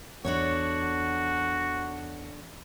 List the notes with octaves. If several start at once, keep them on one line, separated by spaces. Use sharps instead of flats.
E2 D4 F#4 A4 C#5